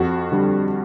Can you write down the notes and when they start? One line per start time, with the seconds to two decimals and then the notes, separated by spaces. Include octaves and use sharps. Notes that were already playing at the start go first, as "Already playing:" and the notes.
Already playing: F2 F#4
0.32 D3 G3